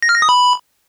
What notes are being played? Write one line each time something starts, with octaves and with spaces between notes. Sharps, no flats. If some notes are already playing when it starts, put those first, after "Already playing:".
A#6
F6
A#6
D#6
B5